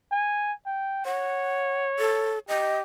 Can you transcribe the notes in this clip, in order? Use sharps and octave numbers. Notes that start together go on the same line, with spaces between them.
G#5
G5
C#5 F#5
A4
G4 D#5